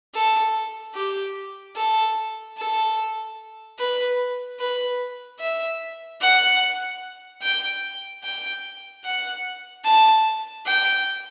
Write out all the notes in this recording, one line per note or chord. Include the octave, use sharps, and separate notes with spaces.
A4
G4
A4
A4
B4
B4
E5
F#5
G5
G5
F#5
A5
G5